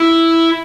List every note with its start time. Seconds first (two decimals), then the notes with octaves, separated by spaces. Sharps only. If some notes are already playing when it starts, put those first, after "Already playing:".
Already playing: E4